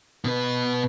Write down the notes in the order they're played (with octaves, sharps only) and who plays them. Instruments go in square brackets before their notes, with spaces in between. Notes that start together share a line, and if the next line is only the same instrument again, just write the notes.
[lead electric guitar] B2 B4